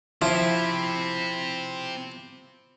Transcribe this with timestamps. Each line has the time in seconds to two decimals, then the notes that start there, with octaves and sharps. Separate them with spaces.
0.22 F3 C4 E4 G4